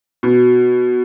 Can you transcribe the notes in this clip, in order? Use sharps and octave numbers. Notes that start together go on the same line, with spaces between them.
B2